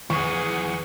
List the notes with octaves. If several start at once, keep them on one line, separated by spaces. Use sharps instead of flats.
E2 E3 F3 G#4 F#5 C#6